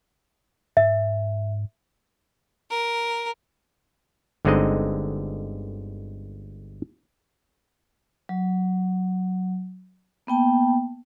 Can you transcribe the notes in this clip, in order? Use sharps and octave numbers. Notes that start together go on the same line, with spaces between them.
G#2 E5
A#4
G1 D3 G#3 C4 D#4 D#5
F#3
A#3 B3 G5 A5